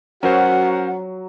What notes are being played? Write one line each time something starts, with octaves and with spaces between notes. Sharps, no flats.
F#3 C#4 F#4 A#4 C5 F#5